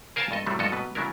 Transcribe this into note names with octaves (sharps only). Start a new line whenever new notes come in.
G#4 A#4 C5 F5 G#5 A5
G2 A4 D#5
A2 C3 D#3 F#3 G3 A3
G2 F3 F#4 A4 D#5
B2 F#3 B4
C#3 F#3 G#3 D4 E4 A#4